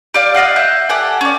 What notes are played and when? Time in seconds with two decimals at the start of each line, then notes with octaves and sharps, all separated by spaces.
0.14 G4 D5 F5
0.34 F4 D#5 F5 F#5
0.56 E5 F#6 G6
0.89 G4 A4 F#5 G#5
1.21 C#4 D5